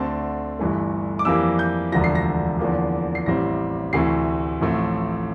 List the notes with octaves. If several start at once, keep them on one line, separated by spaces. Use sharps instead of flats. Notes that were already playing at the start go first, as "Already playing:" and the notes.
Already playing: D2 D3 A3 C4 A5
G1 G2 E3 A3
D6
F2 E3 G3 A#3 E6
G6
E1 D2 D3 F3 A#6
C7
A#6
E2 D3 F3 A#3
C7
A1 A2 G3 C4 A#6
D2 C3 E3 A3 C4 C7
A1 A2 F3 A3 C4